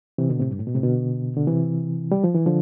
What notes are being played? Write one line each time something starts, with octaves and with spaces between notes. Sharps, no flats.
C3 E3
B2 D3
A2 C3
G2
A2
B2
A2 C3
B2 D3
D3
C3 E3
G3
F3
E3
D3 F3